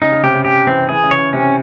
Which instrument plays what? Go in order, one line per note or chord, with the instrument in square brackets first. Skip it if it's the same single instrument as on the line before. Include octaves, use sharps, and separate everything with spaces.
[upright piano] C#3 [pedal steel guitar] D#4
[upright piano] C#3
[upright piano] C3 [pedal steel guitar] G4
[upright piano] C#3
[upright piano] C#3 [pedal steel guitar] G4
[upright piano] E3 [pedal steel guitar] C4
[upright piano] E3 [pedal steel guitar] G#4
[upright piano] C#3
[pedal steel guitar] C#5
[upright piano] C#3
[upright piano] C3 [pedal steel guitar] C#4